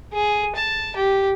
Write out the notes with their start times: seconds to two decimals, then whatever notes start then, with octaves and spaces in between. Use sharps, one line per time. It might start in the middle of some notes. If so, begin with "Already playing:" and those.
0.13 G#4
0.56 A5
0.96 G4